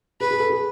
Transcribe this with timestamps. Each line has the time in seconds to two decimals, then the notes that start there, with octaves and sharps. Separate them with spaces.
0.20 G#4 B4
0.31 G#4
0.40 A4
0.50 G#4